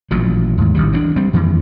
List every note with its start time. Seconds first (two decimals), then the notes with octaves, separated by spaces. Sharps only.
0.11 A1 A#2 F3 F#3
0.58 D#2 G#2
0.75 A1 D#3 G3
0.93 E3 B3 D4
1.16 G3 C4
1.33 F2 D#3 E3 A#3